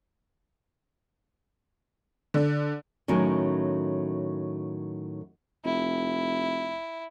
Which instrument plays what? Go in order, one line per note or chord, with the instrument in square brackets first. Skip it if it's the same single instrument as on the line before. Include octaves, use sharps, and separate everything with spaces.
[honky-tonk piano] D3
[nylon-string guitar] A2 D#3 F#3 C#4
[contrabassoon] F1 [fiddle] E4